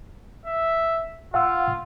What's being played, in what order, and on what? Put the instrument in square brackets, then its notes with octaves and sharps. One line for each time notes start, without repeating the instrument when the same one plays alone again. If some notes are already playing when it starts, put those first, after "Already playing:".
[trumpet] E5
[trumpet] F4 [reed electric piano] F5 F#5 E6